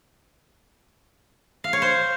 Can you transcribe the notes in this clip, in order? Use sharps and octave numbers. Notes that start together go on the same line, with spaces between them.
F5
C#5
C5